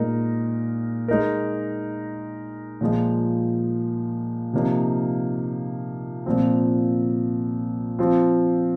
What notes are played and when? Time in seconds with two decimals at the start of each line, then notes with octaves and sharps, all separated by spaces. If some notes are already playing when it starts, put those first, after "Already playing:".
Already playing: A#2 G#3 D#4 A#4
1.08 G#3 D#4 A#4
2.81 A#2 F3 G#3
4.53 C3 F3 A#3 D#4
6.26 A#2 F3 C4
7.99 F3 C4 F4